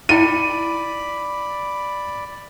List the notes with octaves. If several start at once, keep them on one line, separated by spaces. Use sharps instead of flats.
D#4 E4 D5 G5 B5 D#7